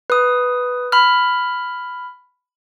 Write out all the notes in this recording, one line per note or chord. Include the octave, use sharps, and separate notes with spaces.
B4 D#6
B5 F6